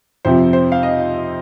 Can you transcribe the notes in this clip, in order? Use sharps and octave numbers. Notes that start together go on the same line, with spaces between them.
F2 C3 F3 C4 C5
C5
F5
D#5